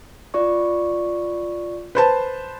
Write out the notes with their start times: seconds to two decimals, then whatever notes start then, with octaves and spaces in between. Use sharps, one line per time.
0.34 F4 D5 C#6
1.95 B4 C5 A5